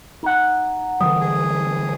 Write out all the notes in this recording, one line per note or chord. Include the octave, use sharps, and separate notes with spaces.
D#4 F#5
D3 E3 G3 D#6
G#4